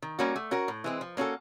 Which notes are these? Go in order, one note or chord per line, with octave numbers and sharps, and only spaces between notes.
D#3
G3 A#3 C#4 F#4
A3
C#4 F#4 A#4
A2
E3 G#3 C4
F3
A#3 C#4 F#4 A4